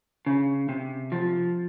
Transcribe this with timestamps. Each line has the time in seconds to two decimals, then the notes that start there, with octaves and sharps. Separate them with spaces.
0.26 C#3
0.69 C3
1.12 F3